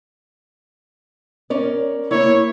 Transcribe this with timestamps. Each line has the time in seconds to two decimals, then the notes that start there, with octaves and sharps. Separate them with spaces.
1.50 C#4 A#4 D5
2.11 A#3 E4 C#5